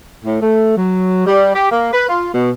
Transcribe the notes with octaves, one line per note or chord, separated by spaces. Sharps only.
A2
A3
F#3
G3
G4
A#3
B4
F4
B2